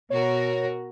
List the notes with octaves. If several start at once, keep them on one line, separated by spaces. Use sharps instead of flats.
B2 F#4 A#4 C#5